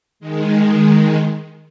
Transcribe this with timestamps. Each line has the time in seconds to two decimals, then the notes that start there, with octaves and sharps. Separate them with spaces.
0.20 D#3 G#3